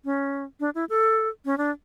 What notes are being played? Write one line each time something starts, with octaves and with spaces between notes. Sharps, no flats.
C#4
D4
E4
A4
C#4
D4